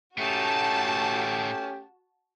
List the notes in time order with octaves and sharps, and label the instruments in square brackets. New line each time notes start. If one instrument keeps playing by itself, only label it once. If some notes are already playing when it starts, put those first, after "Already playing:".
[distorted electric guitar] A2 D#4 [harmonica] A3 C#4 G4 [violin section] F#4 A5